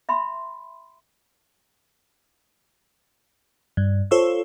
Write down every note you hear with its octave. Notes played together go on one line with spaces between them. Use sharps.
E5 B5 C6
G2
F4 A4 C5 C#5 C#6 E6